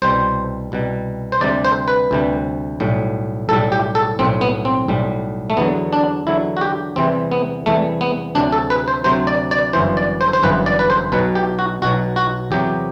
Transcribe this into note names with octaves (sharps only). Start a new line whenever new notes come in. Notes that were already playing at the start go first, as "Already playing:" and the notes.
C2 B2 G3 C5
C2 B2 G3
C5
D2 C3 G3 D5
C5
B4
D2 C3 G3
B1 A2 G3
B1 A2 G3 A4
G4
A4
B1 A2 G3 C4
B3
C4
B1 A2 G3
A3
E2 D3 F#3 B3
D4
E2 D3 F#3 E4
F#4
G4
E2 C3 E3 G3 C4
B3
E2 C3 E3 G3 A3
B3
D2 C3 F#3 D4
A4
B4
C5
D2 C3 F#3 C5
D5
D5
G1 F#2 E3 C5
D5
C5
C5
G1 F#2 E3 B4
D5
B4
C5
B1 B2 F#3 B4
G4
F#4
B1 B2 F#3 F#4
F#4
E2 C3 F#3 G4